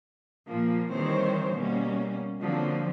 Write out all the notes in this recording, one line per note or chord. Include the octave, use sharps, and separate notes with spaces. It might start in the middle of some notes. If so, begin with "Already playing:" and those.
A#2 F3 A#3
D#3 E3 G3 C4 C5 C#5
B2 G3 A#3 C#4
D3 F3 F#3 A#3 C4